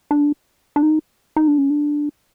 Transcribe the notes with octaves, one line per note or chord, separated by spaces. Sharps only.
D4
D4
D#4
D#4
D4
C#4
D4